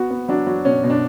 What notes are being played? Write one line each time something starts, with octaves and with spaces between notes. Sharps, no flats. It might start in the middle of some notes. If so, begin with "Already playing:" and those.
Already playing: B3 F#4
B3
F#3 D4
F#3
B2 C#4
B2
D4